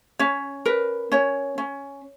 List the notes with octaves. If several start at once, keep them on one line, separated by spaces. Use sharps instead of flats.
C#4 C#5
A#4 B4
C#4 C#5
C#4